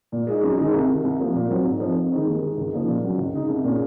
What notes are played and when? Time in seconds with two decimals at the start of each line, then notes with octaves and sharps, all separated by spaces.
0.12 A#2
0.27 G#3 D#4
0.43 F#2
0.58 D#3 G#3 D#4
0.73 C2
0.89 C3 D#3
1.04 C2
1.19 C3 F3 A#3
1.34 A#2
1.50 F#3 C4
1.66 G#2
1.80 F3 C4 D#4
1.96 F2
2.12 D#3 G#3 C4 D#4
2.27 D#2
2.42 D#3 G#3
2.58 C#2
2.72 C#3 F3 A#3 D#4
2.87 A#2
3.04 F#3 C#4
3.18 C#2
3.34 C#3 G#3 D#4
3.49 C2
3.64 A#2 G#3 C#4